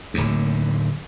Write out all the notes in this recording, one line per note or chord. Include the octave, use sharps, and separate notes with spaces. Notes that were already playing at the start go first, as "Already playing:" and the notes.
D1 D#2